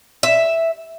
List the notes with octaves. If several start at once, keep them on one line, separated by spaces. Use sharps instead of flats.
E5